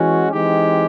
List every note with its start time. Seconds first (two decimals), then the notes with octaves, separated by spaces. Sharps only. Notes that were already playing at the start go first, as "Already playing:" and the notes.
Already playing: E3 G#3 C#4 F#4
0.32 E3 G#3 C4 D#4 G4